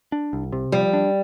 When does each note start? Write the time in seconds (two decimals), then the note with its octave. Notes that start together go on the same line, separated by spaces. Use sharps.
0.12 D4
0.33 C2
0.52 C3
0.72 F3 G3
0.93 D4